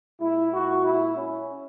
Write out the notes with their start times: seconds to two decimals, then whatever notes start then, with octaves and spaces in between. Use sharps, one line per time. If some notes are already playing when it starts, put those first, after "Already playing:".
0.20 A#2 G#3 E4
0.52 F#4
0.83 E4
1.15 C#4